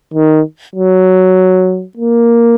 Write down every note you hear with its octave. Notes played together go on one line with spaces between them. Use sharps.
D#3
F#3
A#3